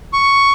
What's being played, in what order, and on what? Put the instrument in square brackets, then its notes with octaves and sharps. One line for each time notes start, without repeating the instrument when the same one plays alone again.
[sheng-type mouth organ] C#6